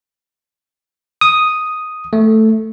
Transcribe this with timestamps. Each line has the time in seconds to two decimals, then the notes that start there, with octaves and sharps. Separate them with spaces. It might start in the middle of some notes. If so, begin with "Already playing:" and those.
1.21 D#6
2.13 A3